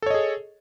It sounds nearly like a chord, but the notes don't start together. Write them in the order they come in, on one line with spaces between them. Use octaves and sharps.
A4 C#5 D#5 G#4